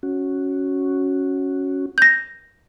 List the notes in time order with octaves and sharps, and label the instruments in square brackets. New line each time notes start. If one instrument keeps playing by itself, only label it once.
[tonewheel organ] C#4 F#4
[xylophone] G6 A#6